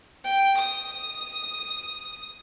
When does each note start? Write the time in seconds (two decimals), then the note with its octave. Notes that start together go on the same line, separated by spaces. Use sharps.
0.24 G5
0.57 D#6